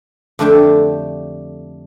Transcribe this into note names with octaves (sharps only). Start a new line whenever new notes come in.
F2 D3 A3 D4 G4